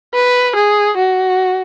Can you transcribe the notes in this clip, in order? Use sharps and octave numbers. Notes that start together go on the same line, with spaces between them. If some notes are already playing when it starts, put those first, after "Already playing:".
B4
G#4
F#4